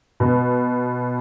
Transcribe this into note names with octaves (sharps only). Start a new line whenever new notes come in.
B2